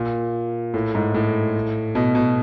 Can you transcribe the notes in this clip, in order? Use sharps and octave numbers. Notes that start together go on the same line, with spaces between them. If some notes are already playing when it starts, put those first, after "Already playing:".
Already playing: A#2
A2
G#2
A2
B2
B2